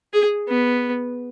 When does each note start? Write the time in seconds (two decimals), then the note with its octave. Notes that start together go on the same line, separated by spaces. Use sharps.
0.13 G#4
0.48 B3